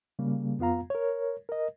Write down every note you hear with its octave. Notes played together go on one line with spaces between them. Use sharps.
C#3 G3 A#3
F2 B3 F4 F5 A#5
A#4 C#5
A#4 D#5